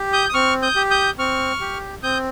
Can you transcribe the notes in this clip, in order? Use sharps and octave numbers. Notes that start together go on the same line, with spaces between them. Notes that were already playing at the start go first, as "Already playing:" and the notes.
Already playing: G4
D#6 G6
D#6
C4 C#6 F6
D#6 G6
G4
D#6 G6
C4 C#6 F6
G4
C4 D#6 G6